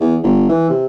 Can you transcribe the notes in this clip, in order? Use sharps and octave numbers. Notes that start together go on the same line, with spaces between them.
E2
G1
E3
C3